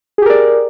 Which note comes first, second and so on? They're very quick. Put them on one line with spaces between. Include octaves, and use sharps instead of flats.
G#4 G4 A#4 D5